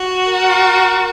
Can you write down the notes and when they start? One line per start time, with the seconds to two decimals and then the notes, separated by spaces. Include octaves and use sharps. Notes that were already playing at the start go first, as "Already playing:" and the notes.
Already playing: F#4
0.28 A#4